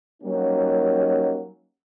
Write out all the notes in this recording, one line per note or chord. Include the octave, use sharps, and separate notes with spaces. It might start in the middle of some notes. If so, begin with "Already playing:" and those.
F#3 G3 A#3 C#4 D#4